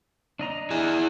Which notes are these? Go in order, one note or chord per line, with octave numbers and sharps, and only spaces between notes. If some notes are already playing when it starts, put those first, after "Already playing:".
D4 D#5 A#5
E4 G#4